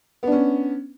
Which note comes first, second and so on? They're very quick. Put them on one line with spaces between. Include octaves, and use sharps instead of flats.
B3 D4 C#4